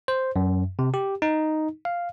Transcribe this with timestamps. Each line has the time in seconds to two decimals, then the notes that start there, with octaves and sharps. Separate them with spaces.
0.08 C5
0.36 F#2
0.79 C3
0.94 G4
1.22 D#4
1.85 F5